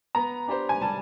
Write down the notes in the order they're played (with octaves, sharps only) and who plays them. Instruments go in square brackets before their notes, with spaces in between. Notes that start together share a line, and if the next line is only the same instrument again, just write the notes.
[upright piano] B3 [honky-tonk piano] A#5
[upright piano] D4 G4 C5
[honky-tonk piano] G#5
[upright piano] G3 [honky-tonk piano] A5